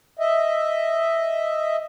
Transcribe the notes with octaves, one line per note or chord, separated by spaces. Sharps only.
D#5 E5